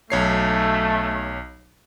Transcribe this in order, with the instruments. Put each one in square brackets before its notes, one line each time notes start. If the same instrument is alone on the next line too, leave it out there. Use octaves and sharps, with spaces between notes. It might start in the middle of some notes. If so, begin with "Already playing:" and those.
[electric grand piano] B1 C#5 C7 [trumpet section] A3